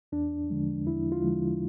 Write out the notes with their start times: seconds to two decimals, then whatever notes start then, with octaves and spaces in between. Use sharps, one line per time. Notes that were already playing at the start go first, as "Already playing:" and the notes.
0.12 E2 D4
0.50 D3 F3 G#3
0.87 E2 E4
1.12 F4
1.24 D3 F3 G#3